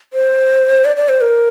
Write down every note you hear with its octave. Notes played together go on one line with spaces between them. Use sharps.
C5
D5
D5
C5
A#4